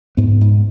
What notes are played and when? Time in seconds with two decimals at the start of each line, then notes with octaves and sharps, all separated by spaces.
0.17 G#2 B3
0.41 G#2